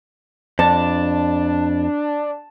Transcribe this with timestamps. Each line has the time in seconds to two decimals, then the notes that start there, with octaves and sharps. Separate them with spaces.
0.59 F2 D4 A5